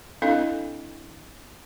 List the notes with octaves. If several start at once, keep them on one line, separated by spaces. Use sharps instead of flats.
C4 D4 E4 A4 D#5 F5